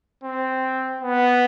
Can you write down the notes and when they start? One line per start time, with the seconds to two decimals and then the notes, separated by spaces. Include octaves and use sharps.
0.24 C4
1.02 B3